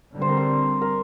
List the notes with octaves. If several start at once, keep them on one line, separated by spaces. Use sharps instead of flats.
D3 G3 C4
C5
A#4
C5
A#4